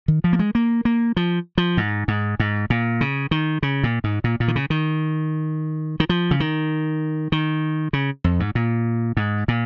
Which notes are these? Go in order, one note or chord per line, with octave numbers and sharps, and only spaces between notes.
D#3
F3
A#3
G#3
A#3
A#3
F3
F3
G#2
G#2
G#2
A#2
C#3
D#3
C#3
A#2
G#2
A#2
A#2
D#3
C#3
D#3
D#3
F3
C#3
D#3
D#3
C#3
F2
G#2
A#2
G#2
A#2